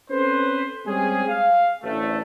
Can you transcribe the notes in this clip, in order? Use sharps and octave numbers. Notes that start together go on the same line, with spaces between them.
C4 C#4 A4 B4 C5
G3 G#3 C4 C#4 G4 G#4
F5
A1 D2 A3